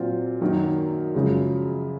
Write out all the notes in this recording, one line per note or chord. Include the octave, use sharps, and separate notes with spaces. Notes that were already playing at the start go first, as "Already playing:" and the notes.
Already playing: A#2 F#3 C4 F4
F#2 D#3 F#3 A#3 D#4
F#2 C#3 F3 G#3